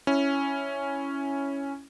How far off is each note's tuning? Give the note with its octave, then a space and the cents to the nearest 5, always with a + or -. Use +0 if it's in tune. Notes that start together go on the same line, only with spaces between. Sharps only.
C#4 +0 E4 +0